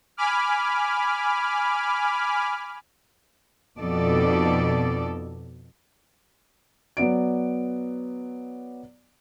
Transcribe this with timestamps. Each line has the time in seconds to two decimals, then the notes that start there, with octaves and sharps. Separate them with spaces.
0.17 G#5 B5 D6 F6
3.79 F2 B2 D#4 A4 D5
6.97 F#3 B3 D5 D7